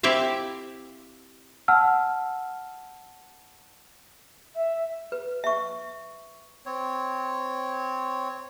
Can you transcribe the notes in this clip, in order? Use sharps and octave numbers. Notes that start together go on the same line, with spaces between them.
C4 E4 G4 E5 F5
F#5 A5 E6 F6
E5
B4
E5 C#6
C4 C#5